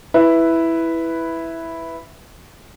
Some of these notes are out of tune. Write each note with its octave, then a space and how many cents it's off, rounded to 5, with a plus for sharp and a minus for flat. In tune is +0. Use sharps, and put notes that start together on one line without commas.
E4 +0 B4 +0